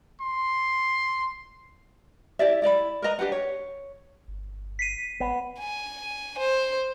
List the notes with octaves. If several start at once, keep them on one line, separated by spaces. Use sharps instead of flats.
C6
E4 G4 D5 E5
E4 D5 D#5 B5
A#4 B4 D#5 A#5
D4 G4 B4 F#5
C#5
G1
B6 C7 D#7
G#1 B3
G#5
C5